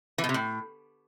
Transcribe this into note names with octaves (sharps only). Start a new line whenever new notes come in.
E3
B2
C3
A2